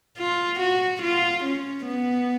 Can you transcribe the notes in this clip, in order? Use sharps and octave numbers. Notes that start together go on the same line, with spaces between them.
F4
F#4
F4
C#4
B3